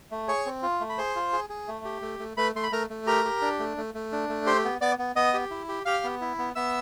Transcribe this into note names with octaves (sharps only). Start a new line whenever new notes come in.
A3
G#4 C#5 C#6
C4
F4
A3
B5
G#4 C5 C6
F4
G#4
G#4
A3
G4
A3
A3
A3 B4 B5
A3 C6
B5
A3 A#4 A#5
A3
G4 A#4 A#5
G4
D4
A3
A3
A3
D4
A3
G4 C5 C6
B3
B3 D5 D6
B3
B3 D#5 D#6
G4
E4
G4
G4 F5 F6
B3
E4
B3
B3 E5 E6